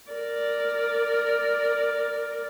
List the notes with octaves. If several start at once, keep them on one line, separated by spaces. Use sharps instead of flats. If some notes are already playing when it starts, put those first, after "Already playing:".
A#4 D5